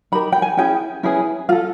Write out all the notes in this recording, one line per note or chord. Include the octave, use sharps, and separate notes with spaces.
D#4 G4 A#4 B5
G5
G#5
C#4 E4 G#4 G5
C#4 E4 G#4 B4
F4 A4 F5